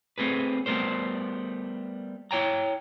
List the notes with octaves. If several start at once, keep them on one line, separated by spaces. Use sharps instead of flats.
A3 C4 G#4 B4
G3 A3 B3 A#4 C5
E4 C#5 G5 A#5